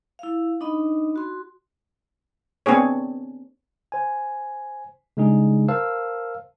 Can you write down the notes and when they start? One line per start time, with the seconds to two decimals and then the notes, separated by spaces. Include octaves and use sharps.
0.19 E4 F5
0.61 D4 D#4 D#5 B5
1.16 F#4 C6
2.66 B3 C4 D4 G#4 C#5
3.92 C5 G#5
5.17 C#3 G3 G#3 D4 D#4 G#4
5.68 A#4 C5 F5 A5 E6